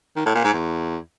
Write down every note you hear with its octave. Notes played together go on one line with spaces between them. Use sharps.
D#3
A2
A#2
G#2
E2